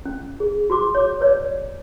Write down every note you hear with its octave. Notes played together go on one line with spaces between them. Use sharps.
C#4
G#4
F#4 C5 C6 D6
C#5 D6
B4 C#5 D5